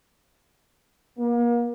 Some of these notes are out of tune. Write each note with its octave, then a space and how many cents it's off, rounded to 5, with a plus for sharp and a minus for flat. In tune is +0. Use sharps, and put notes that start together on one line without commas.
A#3 +35